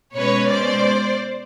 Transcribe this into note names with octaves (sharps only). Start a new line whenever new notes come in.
B2 G#3 C#4 B4 C#5
C5 D5